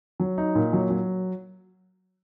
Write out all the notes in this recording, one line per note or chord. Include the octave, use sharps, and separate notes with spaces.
F#3
D#4
A#2
F#3
F#3